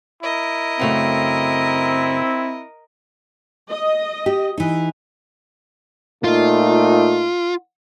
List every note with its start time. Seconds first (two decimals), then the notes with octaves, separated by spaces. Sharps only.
0.23 E4 A#4 D#5
0.80 F#2 C#3 A3 C4
3.71 D#5
4.26 G4
4.58 E3 D#4
6.24 A#2 A3 D#4 F4